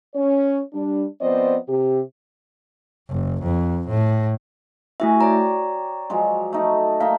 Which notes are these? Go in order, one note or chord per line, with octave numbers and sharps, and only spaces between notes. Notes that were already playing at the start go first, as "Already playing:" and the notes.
C#4 C#5
G3 D4
F3 B3 C4 C5 D5 D#5
C3 G4
F#1
F2
A2
A3 E4 F#4 E5 G#5
C#5 D5 G5 A#5
F3 F#3 G#3
A3 D#4 A4
A3 A#3 D#4 F5